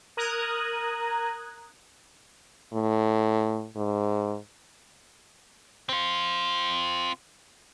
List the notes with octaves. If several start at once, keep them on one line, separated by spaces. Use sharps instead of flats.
A#4 A#5 D#6 F#6 G#6
A2
G#2
C4 F4